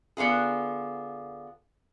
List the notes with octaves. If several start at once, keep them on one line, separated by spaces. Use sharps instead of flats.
D3 B3 D4 F4 G#4